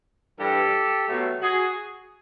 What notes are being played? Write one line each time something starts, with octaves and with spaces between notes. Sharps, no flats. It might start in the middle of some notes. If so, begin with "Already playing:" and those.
G2 E3 G3 G4 A4
B2 F#3 A3
F#4 G#4